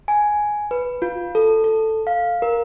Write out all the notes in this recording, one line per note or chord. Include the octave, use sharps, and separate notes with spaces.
G#5
B4
F4
A4
A4
F5
A#4